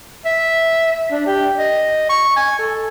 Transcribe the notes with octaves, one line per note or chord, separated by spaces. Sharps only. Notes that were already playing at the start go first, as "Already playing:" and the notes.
E5
D4
G4
D#5
C#6
G#5
A4